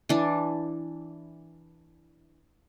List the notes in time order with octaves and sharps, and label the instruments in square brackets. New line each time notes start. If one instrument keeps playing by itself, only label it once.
[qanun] E3 D4